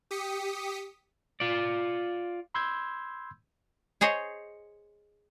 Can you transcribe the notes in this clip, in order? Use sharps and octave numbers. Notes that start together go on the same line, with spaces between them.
G4 D#6 B6 C#7
F4 D5
B5 C6 E6 G6 G#6
G#4 C5 C#5 D#5